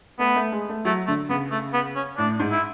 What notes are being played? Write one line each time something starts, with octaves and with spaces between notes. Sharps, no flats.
A3 B3
A3
G#3
A3
F#3 A3
D3 A3
C#3 B3
A3
B3
C#4
A2 D4
G#2
E4